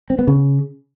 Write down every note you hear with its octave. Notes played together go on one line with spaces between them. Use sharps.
C4
B3
C#3